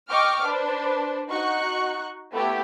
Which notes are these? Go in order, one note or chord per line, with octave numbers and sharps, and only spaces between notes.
D#5 G5 C#6 D6 F6
D4 B4 C5
D#4 F#4 C#6 F#6
A3 B3 E4 G4